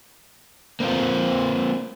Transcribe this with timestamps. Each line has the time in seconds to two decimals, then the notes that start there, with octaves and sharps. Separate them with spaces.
0.80 A#3 C4 D4 F4